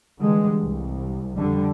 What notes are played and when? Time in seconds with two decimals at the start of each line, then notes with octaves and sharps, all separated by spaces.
0.20 D3 E3 G3 G#3
0.62 C2
1.36 F2 D3 G3